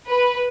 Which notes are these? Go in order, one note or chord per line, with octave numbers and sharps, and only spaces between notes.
B4